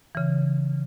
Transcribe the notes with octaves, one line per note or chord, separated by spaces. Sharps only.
C#3 E3